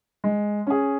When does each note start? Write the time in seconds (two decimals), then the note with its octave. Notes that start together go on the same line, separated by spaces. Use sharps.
0.24 G#3
0.67 C#4 G#4